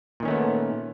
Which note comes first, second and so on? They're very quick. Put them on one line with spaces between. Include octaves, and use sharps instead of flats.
A#2 D#3 C#4 A3 B3